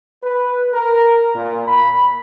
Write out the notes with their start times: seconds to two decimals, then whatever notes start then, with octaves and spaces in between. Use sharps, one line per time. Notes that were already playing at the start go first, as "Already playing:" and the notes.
0.23 B4
0.73 A#4
1.35 A#2
1.67 B5